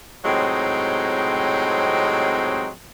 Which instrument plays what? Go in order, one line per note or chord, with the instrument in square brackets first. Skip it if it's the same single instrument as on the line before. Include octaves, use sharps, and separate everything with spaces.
[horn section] A2 C3 F#3 G#3 C4 D#4